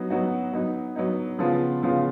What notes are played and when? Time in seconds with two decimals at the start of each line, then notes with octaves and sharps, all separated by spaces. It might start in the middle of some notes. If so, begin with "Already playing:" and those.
Already playing: F#3 B3 D#4 F#4
0.10 F#3 B3 D#4 F#4
0.53 F#3 B3 D#4
0.96 F#3 B3 D#4
1.38 C#3 F3 B3 F4
1.83 C#3 F3 B3 F4